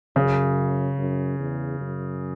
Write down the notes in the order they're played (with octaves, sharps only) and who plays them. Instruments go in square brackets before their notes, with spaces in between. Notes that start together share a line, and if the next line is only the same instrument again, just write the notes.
[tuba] F#2 [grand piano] C#3
[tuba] F#2
E2
F#2